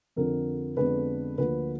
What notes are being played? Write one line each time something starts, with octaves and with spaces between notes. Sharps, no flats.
F2 D3 F3 A#4
F2 D3 G#3 B3 D4 B4
D2 D3 F3 A#3 B4